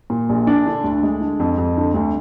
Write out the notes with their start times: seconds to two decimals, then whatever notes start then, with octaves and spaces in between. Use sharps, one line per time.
0.10 A#2
0.29 A#1
0.47 D4
0.66 D3
0.84 D2
1.03 G#3
1.21 D3
1.40 F2
1.58 F2
1.77 D3
1.94 D2